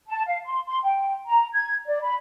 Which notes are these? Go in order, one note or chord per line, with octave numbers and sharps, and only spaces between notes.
A5
F5
C6
C6
G5
A#5
G#6
D5
B5